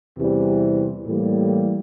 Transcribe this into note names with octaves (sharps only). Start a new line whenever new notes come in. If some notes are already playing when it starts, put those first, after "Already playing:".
E2 C3 E3 G3 C4
A2 E3 G3 A#3